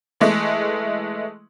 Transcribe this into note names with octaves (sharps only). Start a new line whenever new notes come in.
E3 G#3 A3